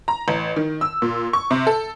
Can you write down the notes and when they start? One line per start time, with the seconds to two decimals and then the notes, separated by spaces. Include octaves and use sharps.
0.08 A#5
0.28 A1
0.56 D#3
0.81 E6
1.02 A#2
1.33 C#6
1.51 C3
1.67 A4